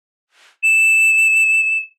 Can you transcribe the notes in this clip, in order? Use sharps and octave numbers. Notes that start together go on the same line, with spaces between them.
E7